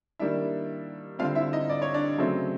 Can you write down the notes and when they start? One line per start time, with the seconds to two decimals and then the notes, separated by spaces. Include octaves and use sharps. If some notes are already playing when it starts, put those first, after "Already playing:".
0.19 D#3 G3 A#3 D4 E4 E5
1.19 D3 G3 C4 F4 F5
1.35 E4 E5
1.53 D#4 D#5
1.70 D5
1.82 C#5
1.94 D4 D5
2.18 C#3 F#3 A3 C4